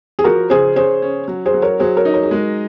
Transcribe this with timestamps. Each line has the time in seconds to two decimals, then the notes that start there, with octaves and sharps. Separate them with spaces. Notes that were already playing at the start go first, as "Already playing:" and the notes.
0.19 G#4
0.24 F3 F#4 A#4
0.50 C#3 G#4 C5
0.76 C#4 G#4 C5
1.02 C#4
1.28 F#3
1.46 G#4 C5
1.54 F#3
1.62 A#4 C#5
1.80 F#3 G#4 C5
1.97 A#4 C#5
2.05 D#4
2.14 A#4 C#5
2.23 G#4
2.31 G#3 F#4 A#4